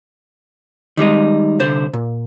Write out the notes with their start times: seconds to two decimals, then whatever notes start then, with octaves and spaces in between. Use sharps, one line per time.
0.97 D#3 G3 G#3 D#4
1.59 C2 D3 C5
1.93 A#2